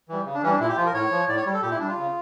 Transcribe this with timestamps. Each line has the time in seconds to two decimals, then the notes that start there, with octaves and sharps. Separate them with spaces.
0.09 E3 G3
0.26 C#3
0.34 D4
0.43 E3 G3 C#4
0.51 D4
0.60 A#2 E4
0.69 G4
0.77 F3 F4
0.86 A#4
0.94 A2 C#5
1.11 F3
1.28 A2 D5
1.37 C#5
1.46 G3
1.54 A4
1.62 A#2 G4
1.71 E4
1.80 G3 D4
1.88 F4
1.97 C#3